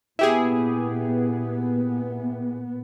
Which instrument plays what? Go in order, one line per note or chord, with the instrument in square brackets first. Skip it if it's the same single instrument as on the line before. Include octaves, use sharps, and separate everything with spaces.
[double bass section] A#2 B3 [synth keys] E4 G4 G#4